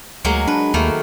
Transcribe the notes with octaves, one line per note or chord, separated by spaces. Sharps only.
D2 F#3 G#3 A#3
D4 B4
D#2 D#3 A3 A#3